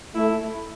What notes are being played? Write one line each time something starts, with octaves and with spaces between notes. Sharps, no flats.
A3 E4